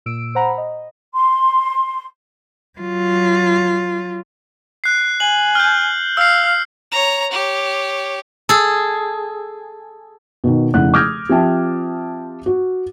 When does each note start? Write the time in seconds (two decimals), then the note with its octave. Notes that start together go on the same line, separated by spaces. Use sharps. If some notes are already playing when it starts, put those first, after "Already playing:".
0.06 A#2 E6 D7
0.35 C5 F#5 A#5 B5
0.58 D#5
1.14 C6
2.79 F#3 F4
4.84 F#6 C7
5.20 G#5 F#7
5.55 F6 G6
6.17 F5 E6 C7
6.92 C#5 A#5
7.32 G4 C#5
8.49 G#4 A4
10.44 B2 D#3
10.74 F1 C#3 E4 F#5 F#6
10.94 D6 D#6 F6 G6 G#6 A#6
11.29 F3 C4 G4 E5 G5 A5
12.46 F#4